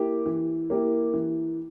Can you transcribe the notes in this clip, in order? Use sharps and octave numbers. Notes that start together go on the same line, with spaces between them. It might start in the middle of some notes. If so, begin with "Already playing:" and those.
Already playing: A#3 E4 G4
E3
A#3 E4 G4
E3